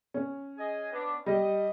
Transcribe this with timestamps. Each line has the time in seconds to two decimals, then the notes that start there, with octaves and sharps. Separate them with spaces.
0.14 C#4
0.58 G#4 D#5 G#5
0.92 B3 D4
1.26 G3 D#5